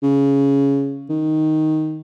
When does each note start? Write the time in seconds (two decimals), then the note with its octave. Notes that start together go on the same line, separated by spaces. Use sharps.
0.03 C#3
1.10 D#3